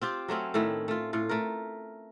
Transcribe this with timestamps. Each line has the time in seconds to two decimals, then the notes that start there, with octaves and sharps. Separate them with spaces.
0.02 C4 F4 G4
0.28 F#3 A3 C4 C#4
0.54 A2 D#3 A3 E4
0.88 A3 F4
1.13 A2 F4
1.29 A3 A#4